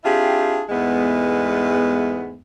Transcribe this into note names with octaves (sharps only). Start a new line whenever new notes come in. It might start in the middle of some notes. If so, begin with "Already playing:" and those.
C4 D4 E4 F4 G4 G#4
E2 G#2 G#3 A3 B3